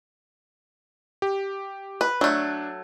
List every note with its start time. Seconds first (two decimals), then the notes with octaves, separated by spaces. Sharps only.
1.22 G4
2.01 B4
2.21 F#3 A3 D4